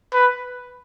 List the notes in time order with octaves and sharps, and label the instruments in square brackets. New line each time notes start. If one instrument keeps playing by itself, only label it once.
[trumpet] B4